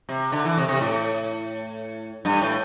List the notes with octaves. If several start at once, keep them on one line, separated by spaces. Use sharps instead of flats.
C3
D3
E3
C3
C3
A2
G2
A2